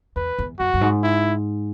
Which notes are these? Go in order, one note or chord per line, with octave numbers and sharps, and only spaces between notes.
E2 B4
E2
F#2 F#4
F#2
G#2
E4